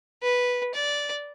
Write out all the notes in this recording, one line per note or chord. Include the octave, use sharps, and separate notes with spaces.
B4
D5